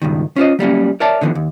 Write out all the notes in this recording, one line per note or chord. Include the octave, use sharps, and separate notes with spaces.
C#2 G2 B2 D#3
C#4 F4 C5 D#5
F#3 G3 A#3 C#4
A#4 C#5 D5 E5 A5
D3 D#3 F3 A3 B3
D#2